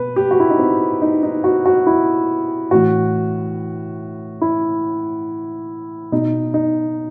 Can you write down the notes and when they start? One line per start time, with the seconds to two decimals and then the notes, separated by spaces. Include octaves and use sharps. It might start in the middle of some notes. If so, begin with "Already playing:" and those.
Already playing: B2 B4
0.16 G4
0.31 F#4
0.40 E4
0.50 D#4
0.59 C4
1.02 D#4
1.23 D#4
1.44 F#4
1.66 F#4
1.87 E4
2.71 A2 E3 F#4
4.42 E4
6.12 B2 D#4
6.54 D#4